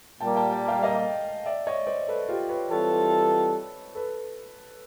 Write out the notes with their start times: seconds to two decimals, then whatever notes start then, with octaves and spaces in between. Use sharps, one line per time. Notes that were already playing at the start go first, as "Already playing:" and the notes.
0.20 A#2 G3 A#3 G5 A5
0.36 G5 A5
0.52 G5 A5
0.68 F5 G5
0.83 D#5 F5
1.46 D5 E5
1.67 C#5 D#5
1.87 C5 D5
2.08 A4 B4
2.29 F4 G4
2.49 B4 C#5
2.71 E3 G3 C4 F4 A4 B4 C#5
3.95 A4 B4